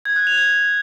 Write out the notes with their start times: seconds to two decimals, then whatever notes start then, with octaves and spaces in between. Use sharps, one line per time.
0.05 G#6
0.16 F#6
0.27 F7
0.38 G#6